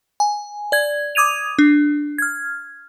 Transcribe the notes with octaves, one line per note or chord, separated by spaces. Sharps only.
G#5
D5 G#6
D6 D#6 G#6 D#7 F7
D4
F6 G#6